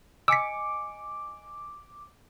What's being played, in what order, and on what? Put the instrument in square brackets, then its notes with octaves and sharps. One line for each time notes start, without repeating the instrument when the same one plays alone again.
[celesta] D#5 G#5 C#7 [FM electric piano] D6 [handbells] E6 B6